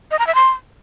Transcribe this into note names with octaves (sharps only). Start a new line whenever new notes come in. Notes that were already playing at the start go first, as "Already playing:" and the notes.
D#5
A#5
E5
C6